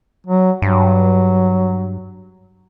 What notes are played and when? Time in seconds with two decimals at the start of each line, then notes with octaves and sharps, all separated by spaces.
0.27 F#3
0.62 G2 F#3